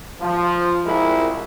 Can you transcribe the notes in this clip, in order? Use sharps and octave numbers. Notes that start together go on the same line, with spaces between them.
F3
C2 F3 G#3 E4 A#4